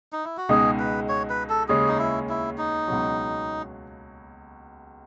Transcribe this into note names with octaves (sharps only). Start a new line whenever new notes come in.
D#4
E4
F#4
C#2 B2 G#3 D#4 G#4
B4
C#5
B4
A4
D#2 C#3 G#3 C#4 G#4
D#4
E4
E4
D#4
C#2 B2 F#3